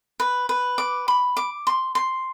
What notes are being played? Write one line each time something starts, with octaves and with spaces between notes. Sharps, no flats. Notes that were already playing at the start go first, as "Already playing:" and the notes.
B4
B4
D6
B5
D6
C6
C6